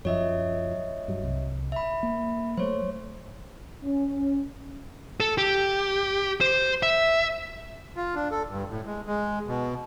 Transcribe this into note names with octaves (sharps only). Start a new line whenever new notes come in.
F#2 F3 C#5 D#5 E5
G2 F#3
C2
E5 B5
A#3
F#3 A3 C5 C#5
C#4
A4
G4
C5
E5
F4
D4
A4
G2
A2
G#3
G#3
B2